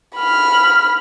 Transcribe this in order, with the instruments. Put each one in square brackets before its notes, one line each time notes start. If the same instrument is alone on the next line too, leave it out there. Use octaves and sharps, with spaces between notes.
[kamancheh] B5 F6